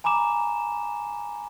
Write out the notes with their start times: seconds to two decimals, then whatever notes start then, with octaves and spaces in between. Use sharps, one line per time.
0.04 G#5 A#5 B5 D6 E7